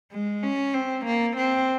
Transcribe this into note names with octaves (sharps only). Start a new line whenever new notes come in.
G#3
C#4
C4
A#3
C4